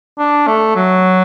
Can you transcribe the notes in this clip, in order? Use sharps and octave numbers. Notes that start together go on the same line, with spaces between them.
D4
A3
F#3